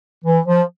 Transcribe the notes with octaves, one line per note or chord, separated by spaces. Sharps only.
E3
F3